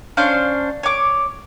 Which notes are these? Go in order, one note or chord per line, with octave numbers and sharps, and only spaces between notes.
C#4 D4 C5 F5
C#5 D6